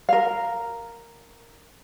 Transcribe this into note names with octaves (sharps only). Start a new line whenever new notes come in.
A#4 F5